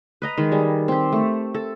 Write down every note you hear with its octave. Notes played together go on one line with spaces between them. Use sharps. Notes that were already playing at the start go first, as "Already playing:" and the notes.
B4 D#5 A#5
D#3 G#3
G3 G#4
C4 G4
A3
A4